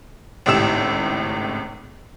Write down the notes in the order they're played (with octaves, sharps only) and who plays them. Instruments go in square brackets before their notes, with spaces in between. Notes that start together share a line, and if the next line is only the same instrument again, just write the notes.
[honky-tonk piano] G#1 C#2 A2 G4 E6 E7